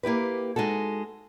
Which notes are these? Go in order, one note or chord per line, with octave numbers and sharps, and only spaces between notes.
A#3 E4 G4 B4
G#3 D#4 F#4 A4